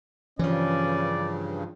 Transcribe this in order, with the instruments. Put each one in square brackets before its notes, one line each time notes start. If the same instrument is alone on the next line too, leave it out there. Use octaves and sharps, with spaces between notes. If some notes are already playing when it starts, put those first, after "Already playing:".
[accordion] G2 C#3 [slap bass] E3 F3 [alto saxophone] C#4 [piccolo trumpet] D5